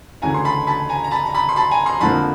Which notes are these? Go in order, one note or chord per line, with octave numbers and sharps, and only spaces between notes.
D2 C#3 E3 G#5 A#5
C6
A5 B5
A5 B5
G#5 A#5
A#5
A5 B5
A#5
A5 B5
C6
A5 B5
G#5 A#5
A#5 C6
F2 D3 F3 A#3 A5 B5